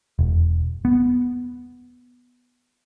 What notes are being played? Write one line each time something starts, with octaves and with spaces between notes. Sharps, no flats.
E1
B3